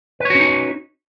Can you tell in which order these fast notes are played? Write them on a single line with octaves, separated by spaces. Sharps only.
B4 C#5 F#4 C#4 D#4